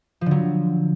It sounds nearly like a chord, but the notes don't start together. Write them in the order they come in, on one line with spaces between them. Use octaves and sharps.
F3 D3 F#3